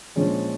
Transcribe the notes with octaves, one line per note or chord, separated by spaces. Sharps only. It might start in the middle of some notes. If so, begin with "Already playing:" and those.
A#2 F3 G#3 C#4